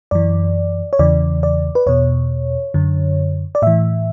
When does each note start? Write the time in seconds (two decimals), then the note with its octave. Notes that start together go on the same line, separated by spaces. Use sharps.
0.11 F#2 E3 D5
0.93 C#5
0.99 E2 C#3 E3 D5
1.43 D5
1.75 B4
1.86 E2 B2 C#5
2.74 F#2 D3
3.55 D5
3.62 A2 E3 E5